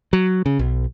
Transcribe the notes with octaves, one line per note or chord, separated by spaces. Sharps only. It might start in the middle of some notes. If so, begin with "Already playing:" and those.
F#3
C#3
B1